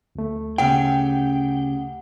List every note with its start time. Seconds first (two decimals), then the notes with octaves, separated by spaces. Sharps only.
0.15 D2 A3
0.58 C#3 G4 F#5 G5